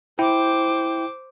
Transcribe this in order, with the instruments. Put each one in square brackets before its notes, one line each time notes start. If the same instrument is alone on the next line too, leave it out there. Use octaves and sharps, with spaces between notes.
[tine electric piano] E4 G5 [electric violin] C5 D6